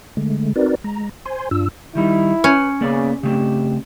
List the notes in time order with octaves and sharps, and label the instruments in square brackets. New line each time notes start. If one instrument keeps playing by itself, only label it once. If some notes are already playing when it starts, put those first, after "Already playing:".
[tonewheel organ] D3 G#3 A3
C4 D#4 F#4 A#4 B4 D5
G#3 A#5
C5 G#5 C6
G2 D4 F4 E6
[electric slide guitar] D#3 G3 D#4 [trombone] E4
[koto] C#4 [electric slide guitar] B4
[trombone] C#3 [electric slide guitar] A#3 B3 D5
[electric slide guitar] C#3 A3 C4 [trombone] G4